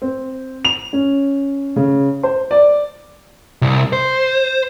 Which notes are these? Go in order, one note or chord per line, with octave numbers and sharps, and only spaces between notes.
C4
F7
C#4
C#3
C5
D5
C2
C5